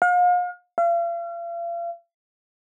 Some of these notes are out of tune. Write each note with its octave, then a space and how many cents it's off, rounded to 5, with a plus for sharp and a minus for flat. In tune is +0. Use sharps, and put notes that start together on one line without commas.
F5 +40
F5 -40